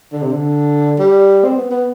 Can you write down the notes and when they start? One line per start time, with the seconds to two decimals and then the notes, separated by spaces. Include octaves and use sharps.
0.12 D3
0.22 C3
0.32 D3
0.99 G3
1.44 C4
1.56 B3
1.71 B3